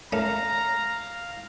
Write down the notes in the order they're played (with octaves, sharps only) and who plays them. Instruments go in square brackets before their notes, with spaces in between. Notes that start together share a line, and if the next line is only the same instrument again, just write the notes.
[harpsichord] A3 C#4 [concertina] F5 [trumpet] A#5